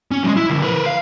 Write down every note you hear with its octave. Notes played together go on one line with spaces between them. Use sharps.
C#4
F#3 G#3
E4
D3 F3
A#4 B4
F5